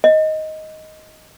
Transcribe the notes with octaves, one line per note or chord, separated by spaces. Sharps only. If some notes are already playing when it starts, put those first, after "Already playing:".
D#5